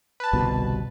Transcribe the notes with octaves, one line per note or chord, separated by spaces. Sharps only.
B4 A5
G1 C2 B2